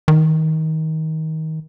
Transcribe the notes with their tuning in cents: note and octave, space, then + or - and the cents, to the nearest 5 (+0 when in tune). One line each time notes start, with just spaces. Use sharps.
D#3 +25